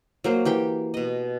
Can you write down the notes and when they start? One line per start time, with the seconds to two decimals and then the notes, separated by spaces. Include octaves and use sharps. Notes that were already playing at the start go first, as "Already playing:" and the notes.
0.24 F#3 A#3 C5
0.45 E3 G4 G5
0.94 B2 D#5